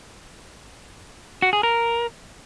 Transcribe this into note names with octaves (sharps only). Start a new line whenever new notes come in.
F#4
G#4
A#4